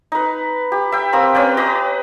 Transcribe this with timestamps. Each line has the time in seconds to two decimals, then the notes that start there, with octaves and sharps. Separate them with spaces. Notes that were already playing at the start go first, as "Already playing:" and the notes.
0.12 D#4 B4
0.72 G4
0.92 E5 G5
1.12 A#3 C4 D#6 E6
1.35 C#4 B4 D5 G5
1.57 B4 D#5 A#5 D6